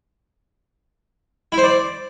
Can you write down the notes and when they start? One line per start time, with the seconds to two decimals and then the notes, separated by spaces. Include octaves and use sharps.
1.52 E4
1.58 C5
1.63 D5